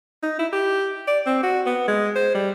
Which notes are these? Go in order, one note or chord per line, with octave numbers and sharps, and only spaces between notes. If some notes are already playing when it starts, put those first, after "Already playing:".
D#4
E4
G4
D5
C4
F#4
B3
G#3
C5
G3